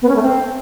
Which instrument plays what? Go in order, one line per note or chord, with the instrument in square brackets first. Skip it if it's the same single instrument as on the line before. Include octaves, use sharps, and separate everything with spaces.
[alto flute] B3
C#4
A3
C4